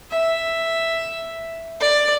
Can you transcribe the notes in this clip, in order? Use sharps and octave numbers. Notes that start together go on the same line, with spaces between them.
E5
D5